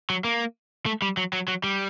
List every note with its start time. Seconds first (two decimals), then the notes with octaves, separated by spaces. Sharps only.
0.10 F#3
0.24 A#3
0.86 A3
1.02 G3
1.17 F#3
1.33 F#3
1.48 F#3
1.64 G3